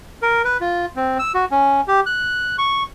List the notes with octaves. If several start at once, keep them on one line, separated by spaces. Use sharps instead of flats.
A#4
B4
F4
C4
E6
F#4
C#4
G4
F#6
C#6